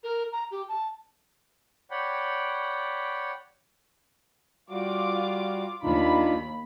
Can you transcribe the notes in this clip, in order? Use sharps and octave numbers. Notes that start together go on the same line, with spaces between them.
A#4
A#5
G4
A5
C#5 D5 F#5 G5 B5
G3 F4 F#4 D6
D#2 D4 D#4 F4 B5